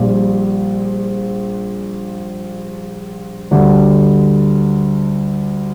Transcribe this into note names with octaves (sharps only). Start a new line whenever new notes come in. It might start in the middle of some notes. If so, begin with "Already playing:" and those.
Already playing: A#1 A#2 G3
D2 D3 G3